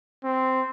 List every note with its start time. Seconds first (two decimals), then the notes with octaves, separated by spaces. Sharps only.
0.24 C4